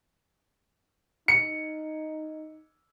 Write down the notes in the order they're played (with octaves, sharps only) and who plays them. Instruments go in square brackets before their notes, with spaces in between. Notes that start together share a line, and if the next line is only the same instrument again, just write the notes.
[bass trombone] D#4 [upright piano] C#7